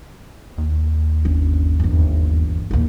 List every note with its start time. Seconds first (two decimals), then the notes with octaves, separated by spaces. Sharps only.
0.58 D#2
1.25 G1 C#4
1.79 G1 E2
2.71 A#1 D#2